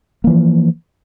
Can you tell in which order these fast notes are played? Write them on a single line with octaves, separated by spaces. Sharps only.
A#3 E3 F3